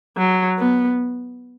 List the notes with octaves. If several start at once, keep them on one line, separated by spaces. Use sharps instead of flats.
F#3
B3